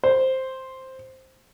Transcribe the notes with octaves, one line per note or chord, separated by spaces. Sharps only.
C5